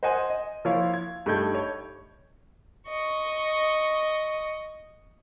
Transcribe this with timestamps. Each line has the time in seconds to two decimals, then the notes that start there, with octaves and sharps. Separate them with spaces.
0.03 C5 D#5 F#5 G#5 C6
0.30 D#5
0.65 F3 A#3 E4 F4 C#5 F5
0.94 G#6
1.26 G2 A3 D#4 G6 G#6
1.55 C#5
2.89 D#5 C#6